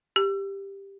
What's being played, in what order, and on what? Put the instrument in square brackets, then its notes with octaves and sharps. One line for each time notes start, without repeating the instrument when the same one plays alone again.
[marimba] G4